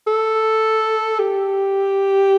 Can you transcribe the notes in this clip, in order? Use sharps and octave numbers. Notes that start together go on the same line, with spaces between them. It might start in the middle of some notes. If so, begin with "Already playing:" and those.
A4
G4